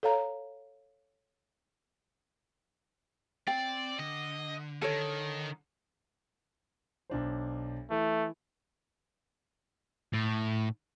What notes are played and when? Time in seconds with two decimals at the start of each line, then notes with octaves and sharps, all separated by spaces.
0.03 A4 C#5 F5 A#5
3.48 C4 D5 G5
3.99 D3 D#5
4.82 D#3 A4 C#5
7.10 B1 D4 C5
7.90 E3 A3
10.13 A2